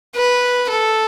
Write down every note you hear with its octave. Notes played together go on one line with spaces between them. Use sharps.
B4
A4